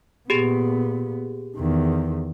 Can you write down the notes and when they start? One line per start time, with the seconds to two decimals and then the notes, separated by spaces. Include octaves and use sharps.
0.30 A#2 B3 G4 G#4
1.57 E2 D#3